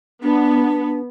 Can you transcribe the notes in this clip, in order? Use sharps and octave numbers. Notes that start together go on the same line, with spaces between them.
B3 D4